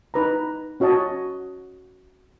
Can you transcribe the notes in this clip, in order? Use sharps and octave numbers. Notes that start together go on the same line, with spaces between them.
D#4 B4 A#5
C#4 F#4 C#5 D#5 A5